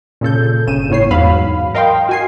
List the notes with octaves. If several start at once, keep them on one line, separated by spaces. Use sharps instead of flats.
A#2 C#3 A4 G6
G1 C#3 D#7 E7
G1 A2 C#5 C7
E2 G#2 F#3 F5 B5
A#4 D#5 F5 G5 C6
F#4 G#5 C7